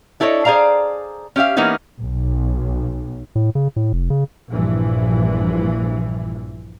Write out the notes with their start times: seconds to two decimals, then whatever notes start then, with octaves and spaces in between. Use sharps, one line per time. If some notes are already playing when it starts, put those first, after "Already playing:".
0.20 D4 E4 A4 C5 C#5 D#5
0.45 G#4 C5 D5 F5 A#5
1.36 C#4 G4 E5 F5
1.56 E3 A#3 B3 C#4 D#4 E4
1.99 B1
3.35 A2
3.55 C#3
3.76 A2
3.93 F1
4.10 C#3
4.50 A#1 G2 E3 F3